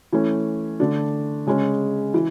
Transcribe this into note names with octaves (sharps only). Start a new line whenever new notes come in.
E3 A3 C#4
D3 A3 D4
C#3 G#3 C#4 G#4
E3